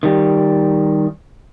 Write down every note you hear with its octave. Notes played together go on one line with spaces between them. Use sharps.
D#3 G3